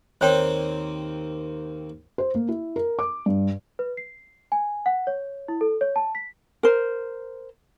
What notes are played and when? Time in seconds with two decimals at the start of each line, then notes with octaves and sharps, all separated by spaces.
0.21 D#2 A#3 C4 C5 C#5 G5
2.18 C5
2.35 A#3
2.49 E4
2.76 A#4
2.99 D6
3.26 G2
3.79 B4
3.97 C7
4.52 G#5
4.86 F#5
5.07 C#5
5.48 E4
5.61 A4
5.81 C#5
5.96 A5
6.15 B6
6.63 A#4 C5